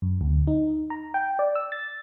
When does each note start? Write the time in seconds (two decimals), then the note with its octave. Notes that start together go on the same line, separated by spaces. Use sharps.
0.02 F#2
0.21 D2
0.47 D#4
0.90 A#5
1.14 G5
1.39 D5
1.55 E6
1.72 A6